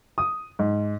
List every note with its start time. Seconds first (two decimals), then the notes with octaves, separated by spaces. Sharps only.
0.18 D#6
0.59 G#2